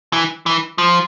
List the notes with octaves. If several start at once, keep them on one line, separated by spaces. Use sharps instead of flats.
E3
E3
F3